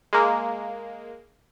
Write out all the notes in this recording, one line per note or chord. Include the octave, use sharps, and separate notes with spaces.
G#3 A#3